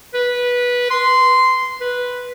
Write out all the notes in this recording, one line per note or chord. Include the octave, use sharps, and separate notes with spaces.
B4
C6
B4